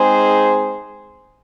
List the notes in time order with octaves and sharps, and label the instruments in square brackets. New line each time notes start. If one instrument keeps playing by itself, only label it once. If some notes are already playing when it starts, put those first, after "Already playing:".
Already playing: [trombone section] G#3 C4 D#4 G#4 C5